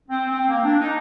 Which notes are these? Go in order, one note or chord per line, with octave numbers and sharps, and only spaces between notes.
C4
C4
A#3
D4
D#4